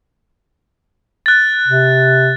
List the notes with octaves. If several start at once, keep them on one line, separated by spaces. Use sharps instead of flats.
F#6 A6
C3